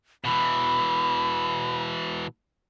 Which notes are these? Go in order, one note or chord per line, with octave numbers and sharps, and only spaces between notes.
B2 E3 B5